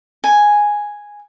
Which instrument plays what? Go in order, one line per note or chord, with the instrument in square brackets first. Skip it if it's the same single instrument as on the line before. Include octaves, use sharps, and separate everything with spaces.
[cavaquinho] G#5